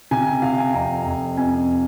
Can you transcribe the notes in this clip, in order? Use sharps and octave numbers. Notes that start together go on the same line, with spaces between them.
C3 G#5
G#5
C3 F5
G#5
F2 A#5
F2
F2 G#5